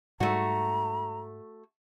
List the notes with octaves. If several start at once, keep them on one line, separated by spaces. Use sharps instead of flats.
G#2 G3 A3 F#4 A#5